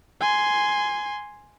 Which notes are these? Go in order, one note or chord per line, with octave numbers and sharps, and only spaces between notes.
G#5 C6